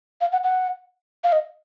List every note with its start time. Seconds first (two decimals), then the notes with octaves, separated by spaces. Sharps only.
0.21 F5
0.32 F#5
0.44 F#5
1.24 F5
1.32 D#5